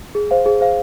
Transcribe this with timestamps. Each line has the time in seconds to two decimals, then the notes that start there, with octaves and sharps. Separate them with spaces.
0.15 G#4
0.31 C5 F5
0.46 G#4
0.61 C5 F5